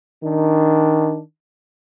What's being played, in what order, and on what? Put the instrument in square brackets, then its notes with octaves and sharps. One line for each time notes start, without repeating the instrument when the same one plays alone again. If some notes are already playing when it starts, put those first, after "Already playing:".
[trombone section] D#3 D4